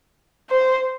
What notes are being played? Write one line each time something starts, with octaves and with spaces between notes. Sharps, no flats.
C5